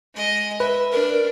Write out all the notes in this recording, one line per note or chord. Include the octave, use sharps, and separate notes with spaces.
G#3 D#5
B4 E5
D4 A#4